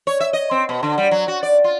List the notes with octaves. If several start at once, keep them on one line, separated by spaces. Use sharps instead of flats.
C#5
E5
D#5
C4
B2
D3
G3
F#3
F#4
D5
F4